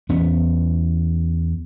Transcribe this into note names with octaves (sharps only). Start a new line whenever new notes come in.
E2 B3 C#4